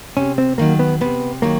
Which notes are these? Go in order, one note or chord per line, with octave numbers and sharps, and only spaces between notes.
C3 C#4
C4
D#3 F#3 A#3
B3
C3 B3
D#3 F#3 A#3